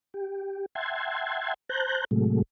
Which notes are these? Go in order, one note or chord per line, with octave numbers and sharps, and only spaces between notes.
G4
E5 F#5 G5 A5 C6 G#6
C5 A5 A#5 F#6 G6
A2 C3 F#3 G#3 A3